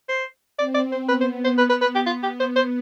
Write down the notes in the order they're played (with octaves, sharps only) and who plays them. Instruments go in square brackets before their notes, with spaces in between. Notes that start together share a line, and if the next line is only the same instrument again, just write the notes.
[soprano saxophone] C5
[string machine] C4 [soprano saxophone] D5
[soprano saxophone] D5
C5
[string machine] B3 [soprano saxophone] B4
[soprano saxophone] C5
C5
B4
B4
B4
G4
F4
G4
C5
C5